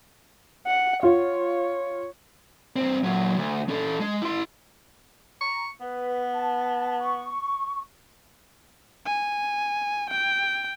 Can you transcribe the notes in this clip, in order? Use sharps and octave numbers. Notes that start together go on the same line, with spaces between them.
F#5
F4 C#5
G2 C4
A#2 F#3
D2
C#4 A4
G#3
E4 C6
A#5 C#6
B3 B4
A5
C#6
G#5
G5